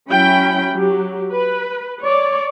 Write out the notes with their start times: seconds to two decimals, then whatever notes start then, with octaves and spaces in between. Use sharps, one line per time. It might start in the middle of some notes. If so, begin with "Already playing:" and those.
0.10 F#3 C#4 E4 G5 B5
0.73 F#3 G4
1.31 B4
2.03 C#5 D5